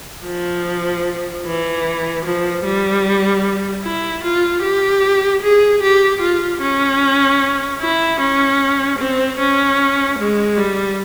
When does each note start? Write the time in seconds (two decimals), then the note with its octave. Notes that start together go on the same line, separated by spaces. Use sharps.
0.26 F3
1.46 E3
2.25 F3
2.64 G3
3.84 E4
4.23 F4
4.63 G4
5.42 G#4
5.82 G4
6.21 F4
6.61 C#4
7.80 E4
8.20 C#4
8.98 C4
9.39 C#4
10.19 G#3
10.57 G3